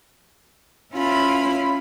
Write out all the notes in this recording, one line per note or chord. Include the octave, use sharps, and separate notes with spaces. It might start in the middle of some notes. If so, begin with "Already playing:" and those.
C#4 E4 F4 B5